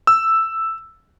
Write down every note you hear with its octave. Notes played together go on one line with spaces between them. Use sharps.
E6